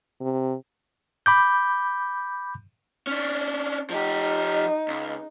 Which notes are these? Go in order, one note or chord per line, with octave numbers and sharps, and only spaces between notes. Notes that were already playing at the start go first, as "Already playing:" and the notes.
C3
B5 D6 G6
C#4 D4
F3 D#4 G4
C#2